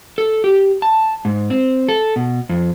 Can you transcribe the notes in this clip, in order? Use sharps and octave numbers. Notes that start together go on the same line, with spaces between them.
A4
G4
A5
G#2
C4
A4
B2
F2